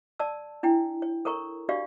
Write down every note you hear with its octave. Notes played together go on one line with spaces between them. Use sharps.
D5 A5 E6
D4 E4 G5
C#5
A4 A#4 C#5 A#5 C#6
D4 F#4 G4 C#5 D5 F5